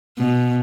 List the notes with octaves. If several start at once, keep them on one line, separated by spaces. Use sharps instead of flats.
B2